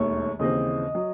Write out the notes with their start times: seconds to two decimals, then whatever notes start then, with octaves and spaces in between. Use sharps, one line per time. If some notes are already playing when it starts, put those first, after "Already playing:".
Already playing: E1 D#2 D#3 A3 C#5
0.39 D#2 C#3 E3 C4 D#5
0.95 F#3